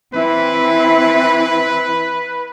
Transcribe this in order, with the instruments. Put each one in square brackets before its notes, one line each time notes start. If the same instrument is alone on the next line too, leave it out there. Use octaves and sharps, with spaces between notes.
[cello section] E3 C4 E4 [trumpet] B4